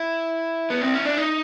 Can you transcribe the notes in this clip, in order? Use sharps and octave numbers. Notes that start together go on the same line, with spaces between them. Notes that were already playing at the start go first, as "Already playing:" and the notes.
Already playing: E4
B3
C4
C#4
D4
D#4